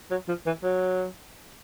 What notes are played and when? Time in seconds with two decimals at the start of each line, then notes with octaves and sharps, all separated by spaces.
0.11 F#3
0.28 F3
0.46 E3
0.63 F#3